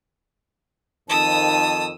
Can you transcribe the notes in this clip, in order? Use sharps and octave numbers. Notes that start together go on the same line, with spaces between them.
F2 D#3 A5 D#6 E6